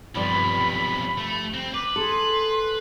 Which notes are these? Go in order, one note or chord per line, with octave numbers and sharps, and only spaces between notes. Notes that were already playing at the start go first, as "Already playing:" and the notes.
B1 G2 C3 F3 D5 B5
A3
C4
B4 D6
G#4 A4 C6